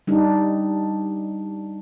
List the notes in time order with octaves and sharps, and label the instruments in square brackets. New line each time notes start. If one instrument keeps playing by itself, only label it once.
[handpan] G3 D4 D#4